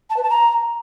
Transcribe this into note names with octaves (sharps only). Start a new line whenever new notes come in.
A5
B4
A5
A#5